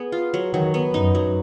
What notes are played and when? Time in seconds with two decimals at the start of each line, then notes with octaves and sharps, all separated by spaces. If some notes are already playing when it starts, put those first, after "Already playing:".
Already playing: B3 G#4
0.12 F4
0.34 F#3
0.53 D#3 F#3
0.74 B3
0.94 F#2 D#4
1.15 F#3